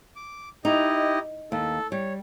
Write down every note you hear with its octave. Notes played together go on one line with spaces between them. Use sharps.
D6
D#4 E4 G4 D#5
D#2 A4
G3 C#5